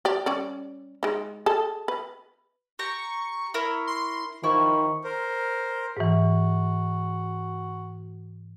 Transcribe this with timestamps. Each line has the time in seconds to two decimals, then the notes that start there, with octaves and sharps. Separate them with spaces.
0.05 G4 D5
0.26 G3 C#4 D5
1.03 G#3 D#4
1.46 G#4 A4 A5
1.88 B4
2.79 G4 A#5 C#6
3.54 E4 A#4 C#5
3.87 C6
4.44 D#3 F3 E4 C#6
5.04 A#4 C5
5.97 G#2 E3 F#4